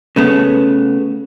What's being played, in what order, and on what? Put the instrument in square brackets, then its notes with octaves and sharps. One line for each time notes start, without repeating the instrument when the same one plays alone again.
[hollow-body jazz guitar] C#3 A3 B3